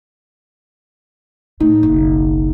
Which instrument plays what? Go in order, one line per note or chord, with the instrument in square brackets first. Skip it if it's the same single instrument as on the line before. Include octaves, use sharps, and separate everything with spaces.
[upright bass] A2 [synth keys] D#4
[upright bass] F#1 B1